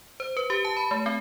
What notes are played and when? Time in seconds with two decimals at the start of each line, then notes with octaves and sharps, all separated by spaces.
0.20 C5
0.37 B4
0.50 G4
0.65 A5
0.77 B5
0.91 A3
1.06 C4